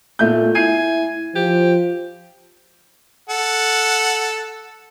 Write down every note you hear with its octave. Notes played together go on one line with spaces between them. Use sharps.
A#2 A3 G6
E4 G#5 C7
F3 G4
A4 F#5